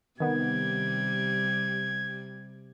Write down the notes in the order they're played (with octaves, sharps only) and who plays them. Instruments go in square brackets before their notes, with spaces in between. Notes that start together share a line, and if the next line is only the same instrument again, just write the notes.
[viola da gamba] C3 G3 [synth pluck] D#3 B3 [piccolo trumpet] G#6